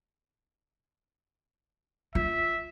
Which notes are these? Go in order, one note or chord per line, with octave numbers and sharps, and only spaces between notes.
F4 E5